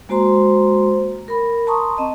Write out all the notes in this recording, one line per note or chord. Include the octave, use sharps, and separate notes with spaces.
G#3 A#3 F#4 C5 A#5 C6
A#4 B5
A5 A#5 C6 C#6 D#6
C4 D#5 A5